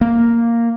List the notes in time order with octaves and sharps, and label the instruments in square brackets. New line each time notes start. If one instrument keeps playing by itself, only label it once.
[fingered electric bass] A#3